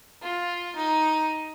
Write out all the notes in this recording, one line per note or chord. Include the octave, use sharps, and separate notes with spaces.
F4
D#4